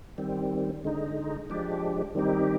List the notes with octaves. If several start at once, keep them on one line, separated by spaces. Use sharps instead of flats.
D#3 G3 C4
D3 G#3 D#4
F3 G#3 D4 G4
D#3 G3 C4 D#4 G4